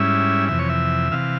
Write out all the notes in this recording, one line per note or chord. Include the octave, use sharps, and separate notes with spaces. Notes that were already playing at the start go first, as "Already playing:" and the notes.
Already playing: G#2 G3 C#4 E4 E5
F2 C3 E3 E5
C#5
E5
C3 E3 F5